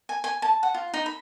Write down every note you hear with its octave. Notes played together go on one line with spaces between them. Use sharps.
G#5
G#5
A5
F#5
F4
D#4
B5